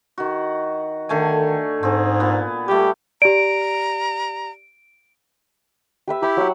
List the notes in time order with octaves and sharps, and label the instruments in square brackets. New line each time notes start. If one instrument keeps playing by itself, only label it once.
[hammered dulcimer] D#3 F#4
[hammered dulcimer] D3 A3 G#5 [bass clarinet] D#3
[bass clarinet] G#2 [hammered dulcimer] C4 G#4
[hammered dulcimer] A#2 B3
[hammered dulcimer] G3 A3 [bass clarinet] G4
[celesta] G4 D5 [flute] A#5 [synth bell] D7
[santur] G4 B4 E5
[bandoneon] E4 G4 [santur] E5 B5
[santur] F#3 F#5